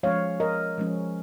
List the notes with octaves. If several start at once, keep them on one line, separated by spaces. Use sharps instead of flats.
F3 G#3 C#4 C#5 F5
A#4 D#5
F3 G#3 C#4